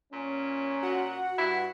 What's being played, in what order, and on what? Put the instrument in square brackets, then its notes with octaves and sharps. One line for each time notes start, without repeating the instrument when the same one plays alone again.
[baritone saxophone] A#2 [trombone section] C#4
[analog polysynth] F#4 F#5
[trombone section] G2 [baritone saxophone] E4